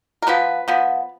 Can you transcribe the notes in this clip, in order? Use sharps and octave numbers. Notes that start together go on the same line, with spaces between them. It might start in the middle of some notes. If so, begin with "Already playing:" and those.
A#4
F3 B3 B4
F3 B3